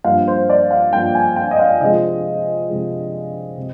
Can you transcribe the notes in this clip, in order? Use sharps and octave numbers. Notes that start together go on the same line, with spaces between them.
G2 F3 A#3 F5
C5
D5
F5
G2 F3 A#3 G5
G#5
G5
D#5
F5
C3 F3 G#3 D#5
C3 F3 G#3
C3